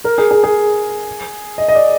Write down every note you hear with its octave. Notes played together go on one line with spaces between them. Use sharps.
A#4
G#4
G#4
G#4
D#5
D#5
D5